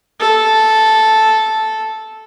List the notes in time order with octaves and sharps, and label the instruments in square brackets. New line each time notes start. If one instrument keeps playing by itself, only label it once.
[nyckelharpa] A4